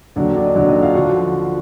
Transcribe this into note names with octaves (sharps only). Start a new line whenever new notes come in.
D#2 D3 F#3 D4 D5
D4 D5
D#5
D#2 D3 F#3 D4 D5
D#4 D#5
F4 F5
D3 F3 F#4 F#5